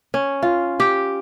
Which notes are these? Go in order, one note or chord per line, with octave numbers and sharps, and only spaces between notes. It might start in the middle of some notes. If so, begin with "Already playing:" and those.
C#4
F4
G4